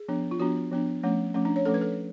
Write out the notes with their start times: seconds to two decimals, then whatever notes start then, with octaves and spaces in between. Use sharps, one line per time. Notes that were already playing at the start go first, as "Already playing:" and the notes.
Already playing: G#4
0.08 F3 B3 D4
0.31 F4
0.40 F3 B3 D4 F#4
0.71 F3 B3 D4
1.03 F3 A3 C#4
1.34 F3 A3 C#4
1.45 D4
1.56 C#5
1.65 F3 A3 C#4 A4
1.74 B4
1.81 A4